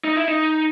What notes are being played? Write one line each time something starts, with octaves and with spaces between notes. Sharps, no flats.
D#4
E4
D#4